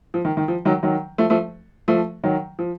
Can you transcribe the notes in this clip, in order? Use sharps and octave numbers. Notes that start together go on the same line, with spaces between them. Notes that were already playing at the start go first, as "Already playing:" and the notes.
F3
D#3
D#3
F3
D#3 F#3
D#3 F#3
F3 A3
F3 A3
F3 A3
D#3 F#3
F3